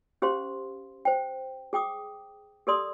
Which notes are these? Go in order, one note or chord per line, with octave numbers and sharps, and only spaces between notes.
C#4 G4 C5 F5 C6
C5 G5
G#4 G5 D6 D#6
G4 A4 A#4 D5 C6 D#6